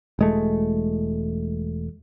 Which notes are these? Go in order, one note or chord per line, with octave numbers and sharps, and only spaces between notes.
E1 G#3 A3